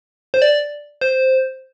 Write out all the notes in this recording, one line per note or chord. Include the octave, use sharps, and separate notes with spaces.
C5
D5
C5